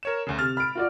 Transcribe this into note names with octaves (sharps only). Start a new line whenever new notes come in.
A#4 C#5 E7
D2 C#3
C3 F6 A6
B5 F6 D7
F4 F#4 D5